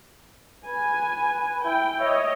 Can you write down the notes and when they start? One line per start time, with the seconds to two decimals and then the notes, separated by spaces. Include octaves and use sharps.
0.67 B4 G#5
1.64 E4 G5
2.00 C#5 D#5 E5